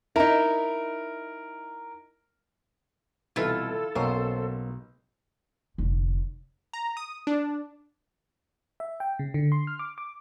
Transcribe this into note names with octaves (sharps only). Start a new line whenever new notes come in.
D#4 E4 A#4
C2 B2 E3 E4 F4 A4
B1 A#3 B3 C#4 C5
F1 D3
A#5
D#6
D4
E5
G5
C#3
D3
C6
F6
D6
D6